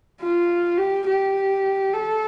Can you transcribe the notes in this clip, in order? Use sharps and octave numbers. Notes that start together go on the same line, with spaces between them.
F4
G4
G4
A4